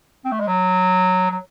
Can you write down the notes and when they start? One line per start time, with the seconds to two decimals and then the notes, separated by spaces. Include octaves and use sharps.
0.25 C4
0.32 A3
0.40 G#3
0.47 F#3
1.31 F#3